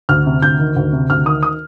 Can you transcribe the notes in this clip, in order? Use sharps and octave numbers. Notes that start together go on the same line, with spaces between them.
D2 F6
C3
D2 G6
D#3
D2
C3
D2 F6
D#3 D#6
D#6